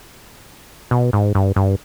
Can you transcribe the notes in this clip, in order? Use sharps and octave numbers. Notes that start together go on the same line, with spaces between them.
B2
G#2
G2
G2